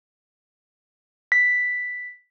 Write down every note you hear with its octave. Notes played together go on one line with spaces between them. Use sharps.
B6